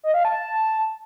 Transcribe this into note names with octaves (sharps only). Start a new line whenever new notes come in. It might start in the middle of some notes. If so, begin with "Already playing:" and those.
D#5
F5
A5